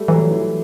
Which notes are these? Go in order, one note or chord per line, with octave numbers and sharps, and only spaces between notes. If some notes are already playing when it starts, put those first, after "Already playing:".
Already playing: G3 A3
E3 F#3
E3